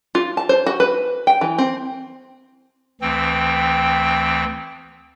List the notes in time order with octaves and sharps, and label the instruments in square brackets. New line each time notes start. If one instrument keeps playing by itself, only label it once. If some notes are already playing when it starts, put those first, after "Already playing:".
[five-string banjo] F4
A5
C5
F#4
B4
G5
E3
C4
[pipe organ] D2 E3 C4 G5